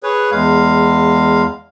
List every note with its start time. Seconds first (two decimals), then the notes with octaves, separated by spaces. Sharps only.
0.03 G#4 B4 C#5
0.32 E2 G#3 F5